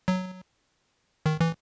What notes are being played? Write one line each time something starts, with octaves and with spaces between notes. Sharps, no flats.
F#3
D#3
E3